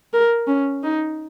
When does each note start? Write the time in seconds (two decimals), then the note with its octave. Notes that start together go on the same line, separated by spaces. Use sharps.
0.13 A#4
0.48 C#4
0.83 D#4